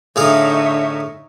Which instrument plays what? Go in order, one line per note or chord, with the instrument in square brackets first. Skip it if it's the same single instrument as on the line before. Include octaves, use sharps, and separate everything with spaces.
[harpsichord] A2 G#4 F5 [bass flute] D3 [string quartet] D#4 C#5 E5